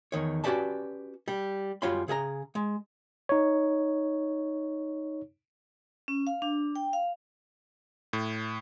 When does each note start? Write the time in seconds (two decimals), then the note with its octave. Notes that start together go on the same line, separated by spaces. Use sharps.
0.12 E2 D#3 C#5
0.44 C#4 F#4 G4 B4 D5 A5
1.28 G3
1.82 F#2 G3 F4 C#5 B5 C6
2.08 C#3 G#4 E5 A#5
2.55 G#3
3.29 D#4 C#5
6.08 C#4
6.27 F5
6.42 D4
6.76 G5
6.93 F5
8.13 A2